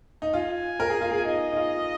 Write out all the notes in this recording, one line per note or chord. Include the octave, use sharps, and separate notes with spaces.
D#4
F4 G#5
A#4
G#4
F4
G#4
D#4 D#5
D#4
F4